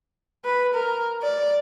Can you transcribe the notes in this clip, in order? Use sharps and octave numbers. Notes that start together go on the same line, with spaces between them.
B4
A#4
D5